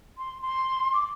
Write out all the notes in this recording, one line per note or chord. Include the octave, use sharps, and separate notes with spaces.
C6
C6
D6